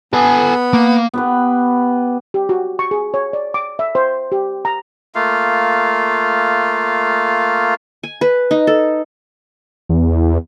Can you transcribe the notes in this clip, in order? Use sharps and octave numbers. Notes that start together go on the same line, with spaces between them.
B3 A4 G#5
A#3
B3 G4 B4
G4
F#4
C#6
G#4
C#5
D5
D6
E5
C5
G4
A#5
A3 A#3 F4 F5
G#5
B4
D#4
A4
E2